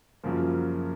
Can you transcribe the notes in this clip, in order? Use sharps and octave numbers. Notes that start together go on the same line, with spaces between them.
F#2 C#3 F3 A#3